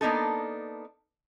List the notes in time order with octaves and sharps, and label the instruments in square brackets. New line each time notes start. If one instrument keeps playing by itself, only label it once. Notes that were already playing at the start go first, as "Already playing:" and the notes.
[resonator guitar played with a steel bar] A#3 B3 D4 D#4 A4